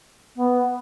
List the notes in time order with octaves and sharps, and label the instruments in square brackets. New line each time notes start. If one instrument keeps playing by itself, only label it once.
[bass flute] B3